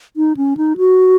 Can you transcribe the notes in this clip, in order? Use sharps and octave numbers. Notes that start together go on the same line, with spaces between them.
D#4
C#4
D#4
F#4